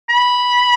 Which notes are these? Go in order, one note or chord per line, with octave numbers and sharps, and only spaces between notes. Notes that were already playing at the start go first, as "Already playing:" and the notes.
B5